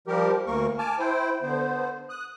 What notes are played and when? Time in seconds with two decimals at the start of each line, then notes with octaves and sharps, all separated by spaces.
0.08 F3 G3 G4 A#4
0.47 D2 A#3 A#4 C#6
0.78 G#5 A5 D6 F6
0.99 E4 C5 G5
1.42 D3 B3 C5
2.09 D#6 F#6